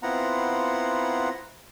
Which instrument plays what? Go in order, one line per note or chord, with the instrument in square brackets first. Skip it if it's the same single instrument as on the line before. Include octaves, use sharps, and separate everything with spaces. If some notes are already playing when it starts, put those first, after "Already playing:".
[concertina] B3 C4 E4 F4 F#5 A#5